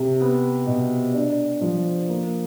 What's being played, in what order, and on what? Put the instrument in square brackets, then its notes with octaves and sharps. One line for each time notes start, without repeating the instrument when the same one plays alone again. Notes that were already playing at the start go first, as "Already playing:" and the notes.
Already playing: [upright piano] C3
B3
B2
D4
F3
A#3